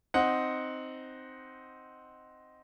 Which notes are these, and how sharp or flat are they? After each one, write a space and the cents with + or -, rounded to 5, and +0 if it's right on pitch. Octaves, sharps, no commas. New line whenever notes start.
C4 +0 D#4 +0 F#5 +0